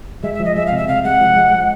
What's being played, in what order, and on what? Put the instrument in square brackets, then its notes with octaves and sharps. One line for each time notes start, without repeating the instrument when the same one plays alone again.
[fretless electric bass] G#3 [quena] E5
[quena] E5
[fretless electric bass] F3
[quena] D#5
[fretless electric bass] G#3 [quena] E5
[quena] F5
[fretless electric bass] C3
[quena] E5
[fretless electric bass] C3 [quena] F5
[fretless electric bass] G#3 [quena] F#5
[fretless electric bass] F3
G#3
G#3